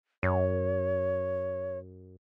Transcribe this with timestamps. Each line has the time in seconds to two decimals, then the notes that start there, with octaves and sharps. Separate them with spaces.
0.23 F#2 C#5